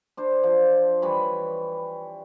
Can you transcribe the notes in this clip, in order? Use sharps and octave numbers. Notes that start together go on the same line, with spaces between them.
D4 C5
F3
E3 G3 C#5 B5